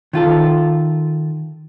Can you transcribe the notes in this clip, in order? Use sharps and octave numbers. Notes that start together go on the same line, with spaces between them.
D#3 F4 A4